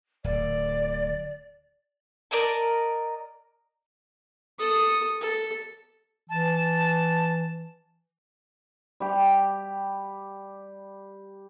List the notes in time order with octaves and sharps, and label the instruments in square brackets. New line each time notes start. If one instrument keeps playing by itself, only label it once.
[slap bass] D1 [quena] D5
[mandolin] A#4 D5 D#5 A5
[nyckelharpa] A4 D#6
A4
[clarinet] E3 [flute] A5
[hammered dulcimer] G3 G4